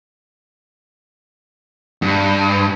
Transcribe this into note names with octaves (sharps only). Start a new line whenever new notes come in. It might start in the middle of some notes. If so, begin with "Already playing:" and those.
G2